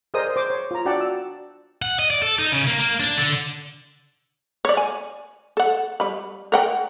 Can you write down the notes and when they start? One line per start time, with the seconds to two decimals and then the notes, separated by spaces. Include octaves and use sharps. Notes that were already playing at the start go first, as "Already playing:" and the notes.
0.14 G#4 A#4 C5 D5 D#5 D#6
0.36 C5 D6
0.50 C#5
0.71 F4 A#5
0.85 D4 F#4 D5 F#5 G5 A5
1.01 E6
1.82 F#5
1.99 D#5
2.10 D5
2.22 A4
2.39 D#4
2.52 C#3
2.67 A#3
2.80 A#3
3.00 D4
3.18 D3
4.65 C#5 D5
4.77 G#5
5.57 A4 F#5
6.00 G3 B5
6.52 A#4 F#5 G5